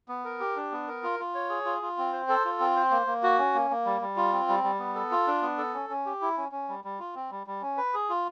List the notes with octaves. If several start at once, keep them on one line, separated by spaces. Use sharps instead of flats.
B3
A#4
G4
D4
B3
A#4
F4
F4
C#5
G#4
F4
F4
C4
C5
A4
F4
C4
C5
A#3
A#3
F#4
C#4
A#3
A#3
G3
G3
F4
C4
G3
G3
B3
A4
F4
D4
B3
A4
C#4
C#4
G4
E4
C#4
C#4
G3
G3
F4
C4
G3
G3
C#4
B4
G#4
F4